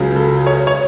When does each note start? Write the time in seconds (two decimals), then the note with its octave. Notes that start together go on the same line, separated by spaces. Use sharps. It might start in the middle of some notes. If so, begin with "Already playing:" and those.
Already playing: C#2 C#3 F#3
0.16 A4
0.47 C#5
0.67 C#5